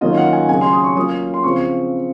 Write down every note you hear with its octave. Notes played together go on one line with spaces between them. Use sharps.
D#3 F#3 A#3 C#4 F4 D#5
F#5
G#5
C#3 F#3 C#4 G#5
C6
D#6
C#6
F#3 A#3 C#4 F4 D#6
C6
C#3 F3 C4 F4 C#6